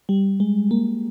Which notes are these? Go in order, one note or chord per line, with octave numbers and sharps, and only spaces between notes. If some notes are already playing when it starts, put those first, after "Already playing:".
G3
G#3
A#3